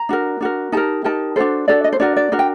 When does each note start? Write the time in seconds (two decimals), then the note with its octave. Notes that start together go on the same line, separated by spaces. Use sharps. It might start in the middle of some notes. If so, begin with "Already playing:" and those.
Already playing: A#5
0.09 D4 F#4 A#4
0.41 D4 F#4 A#4
0.72 D#4 G4 A#4 A5
1.04 D#4 G4 A#4 A5
1.36 D4 F#4 A4 C5
1.68 D4 F#4 A4 D5
1.84 D#5
1.93 C5
2.00 D4 F#4 A#4 D5
2.17 D5
2.32 D4 F#4 A#4
2.39 G5